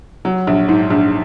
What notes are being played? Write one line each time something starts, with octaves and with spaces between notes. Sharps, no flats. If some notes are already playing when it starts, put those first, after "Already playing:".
F#3
A#1
G#2
A#1